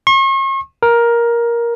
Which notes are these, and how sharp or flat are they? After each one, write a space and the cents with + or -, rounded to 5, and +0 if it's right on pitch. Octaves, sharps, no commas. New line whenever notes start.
C#6 -45
A#4 +10